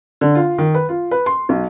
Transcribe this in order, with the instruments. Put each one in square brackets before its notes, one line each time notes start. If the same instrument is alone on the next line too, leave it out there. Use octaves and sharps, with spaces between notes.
[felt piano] D3
F4
D#3
B4
F4
B4
C6
B1